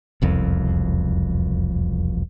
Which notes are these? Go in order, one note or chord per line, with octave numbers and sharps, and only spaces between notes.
E1 C2 F2